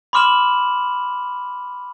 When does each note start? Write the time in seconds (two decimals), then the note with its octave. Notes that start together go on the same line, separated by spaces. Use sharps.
0.13 B5 C6 D6 F6 E7 F#7